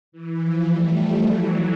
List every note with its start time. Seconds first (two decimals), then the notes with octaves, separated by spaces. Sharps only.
0.12 E3
0.40 F3
0.68 G3 A3
0.96 F3 G3
1.24 E3 F#3